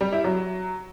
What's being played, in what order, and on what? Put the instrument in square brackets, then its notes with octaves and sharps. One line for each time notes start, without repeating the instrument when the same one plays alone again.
[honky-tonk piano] G3
E4
F#3